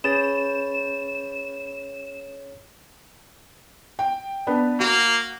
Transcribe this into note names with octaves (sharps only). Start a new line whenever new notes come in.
C#4 G#4 B4 C#5 B5 A6 E7
G5
B3 D4 B4
A#3 F#4